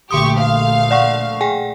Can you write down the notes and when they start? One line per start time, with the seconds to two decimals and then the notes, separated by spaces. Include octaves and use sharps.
0.11 A#1 D3 A3 G4 C6 C#6 D#6
0.40 F5
0.91 D5 F#5 C#6
1.41 G#4 G5 G#5